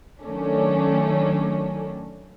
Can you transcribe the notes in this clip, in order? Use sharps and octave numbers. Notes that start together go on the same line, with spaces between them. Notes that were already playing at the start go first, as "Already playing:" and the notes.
D#3 F#3 A3 C#4 D4